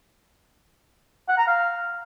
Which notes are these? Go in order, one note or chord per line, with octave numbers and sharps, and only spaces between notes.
F#5
A#5
F5